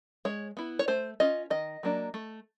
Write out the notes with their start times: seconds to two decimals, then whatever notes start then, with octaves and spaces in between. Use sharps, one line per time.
0.25 G#3 C#5
0.57 B3 E4
0.79 C#5
0.88 A3 C5
1.20 C#4 F4 D#5
1.50 D#3 D#5
1.83 F#3 A#3 D4
2.14 A3